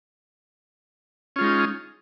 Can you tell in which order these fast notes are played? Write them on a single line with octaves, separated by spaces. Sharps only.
C#4 F4 G#3 D#4